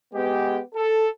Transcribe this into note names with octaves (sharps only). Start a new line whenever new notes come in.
G#3 B3 G4
A4